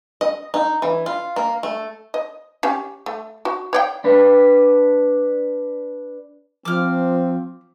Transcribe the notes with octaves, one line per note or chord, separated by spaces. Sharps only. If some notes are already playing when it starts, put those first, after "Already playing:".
D#5
D#4
E3
F4
A#3
A3
D#5
C#4 G4
A3
F#4
C#5 D5 G5
D4 B4
F3 C4 D6 F6